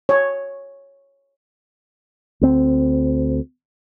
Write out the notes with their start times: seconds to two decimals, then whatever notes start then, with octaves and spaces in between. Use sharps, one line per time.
0.09 C#5
2.41 D2 C4